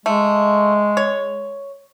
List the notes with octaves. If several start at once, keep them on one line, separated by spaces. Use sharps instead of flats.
G#3 A3
C#5